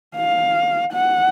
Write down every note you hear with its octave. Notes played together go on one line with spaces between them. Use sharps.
F5
F#5